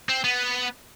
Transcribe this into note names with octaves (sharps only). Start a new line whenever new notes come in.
C4
B3